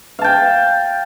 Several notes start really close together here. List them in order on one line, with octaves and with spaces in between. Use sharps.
F5 A5 G5